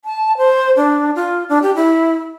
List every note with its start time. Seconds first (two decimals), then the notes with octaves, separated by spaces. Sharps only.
0.05 A5
0.37 C5
0.76 D4
1.15 F4
1.49 D4
1.62 G4
1.75 E4